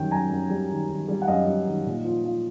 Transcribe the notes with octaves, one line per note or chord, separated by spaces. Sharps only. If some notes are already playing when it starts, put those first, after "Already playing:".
Already playing: F#2 D#3 G3 G5
F#2 G#5 A#5
F#2
G3
D#3
D#3
G3
F#5
F#2 D#5 F5
G3
D#3
A#2
F3
F3